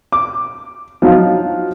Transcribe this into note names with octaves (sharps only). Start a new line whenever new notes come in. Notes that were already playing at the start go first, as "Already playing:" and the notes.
D6
F3 F#3 D#4 F4